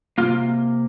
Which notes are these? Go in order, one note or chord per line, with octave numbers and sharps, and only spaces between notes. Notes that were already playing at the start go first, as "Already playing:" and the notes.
C3 D#3 A#3 F4